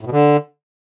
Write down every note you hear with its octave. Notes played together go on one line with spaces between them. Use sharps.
A2
B2
D3